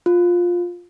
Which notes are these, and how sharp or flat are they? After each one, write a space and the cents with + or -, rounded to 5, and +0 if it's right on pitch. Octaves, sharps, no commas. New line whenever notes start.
F4 +10